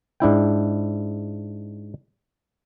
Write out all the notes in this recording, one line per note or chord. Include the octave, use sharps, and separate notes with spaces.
G#2 D4 E4 G5